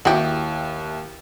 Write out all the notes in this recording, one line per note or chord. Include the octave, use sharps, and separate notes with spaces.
D#2 E4 F#4 G4